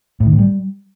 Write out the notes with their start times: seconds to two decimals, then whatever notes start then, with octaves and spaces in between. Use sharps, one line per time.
0.20 A2
0.26 D#3
0.33 A2
0.39 G3